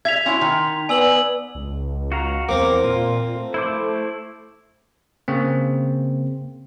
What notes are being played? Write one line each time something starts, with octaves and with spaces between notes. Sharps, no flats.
E5 G#6 B6 F7
C#4 E4 F#4 C6
D#3
B3 D5 G#5 E6 F#7
C#2
F#4 F5 A#5
E2 A#3 C4 D6
A#2 F4
A3
E4 C5 D6
C#3 A#3 C4